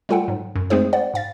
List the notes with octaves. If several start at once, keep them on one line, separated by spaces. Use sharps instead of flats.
G3 A3 F4 A4 F#5 G5
G#2 F#3
F#2
G#3 A3 C4 D#4 G#4 C5
C5 D5 F#5
G#2 F5 A6